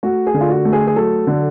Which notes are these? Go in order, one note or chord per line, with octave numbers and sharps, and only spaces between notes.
A3 F#4
G#4
D3
F4
F#4
A3
G#4
G#4
F#3 A4
D3